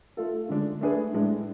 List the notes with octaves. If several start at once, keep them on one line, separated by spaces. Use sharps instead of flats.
A3 F4 A4
D3 G#3 D4
A3 D4 G#4 B4
A2 G#3 D4